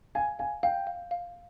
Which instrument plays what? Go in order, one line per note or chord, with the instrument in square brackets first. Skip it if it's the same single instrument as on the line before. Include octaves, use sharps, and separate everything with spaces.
[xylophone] F5 [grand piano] G#5
[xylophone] F5 [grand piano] G#5
[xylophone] F5 [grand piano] G5
[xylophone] F5
F5